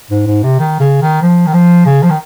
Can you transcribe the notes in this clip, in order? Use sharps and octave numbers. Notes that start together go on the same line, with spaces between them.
G#2
G#2
C3
D#3
C#3
D#3
F3
D#3
F3
C#3
F3
D#3